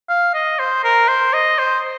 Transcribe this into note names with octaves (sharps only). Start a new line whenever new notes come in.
F5
D#5
C5
A#4
C5
D#5
C5